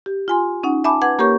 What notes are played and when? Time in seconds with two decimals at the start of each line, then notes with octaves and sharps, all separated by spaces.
0.06 G4
0.28 F4 G#5 C6
0.63 C#4 D#4 F#5
0.84 E5 G#5 A5 B5 D6
1.02 B4 F#5 D6 G#6
1.19 A#3 G4 A#4 C#5 C#6 G6